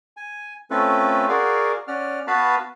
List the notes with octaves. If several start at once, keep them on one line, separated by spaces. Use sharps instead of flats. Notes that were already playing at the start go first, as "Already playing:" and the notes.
G#5
A3 C4 C#4 F4 A4 B4
F#4 G#4 A#4 D5 F5 F#5
C#4 D5 F#5 F6
B3 F#4 B4 F5 A5 B5